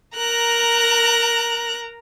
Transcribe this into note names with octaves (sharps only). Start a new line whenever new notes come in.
A#4 A#5 F#6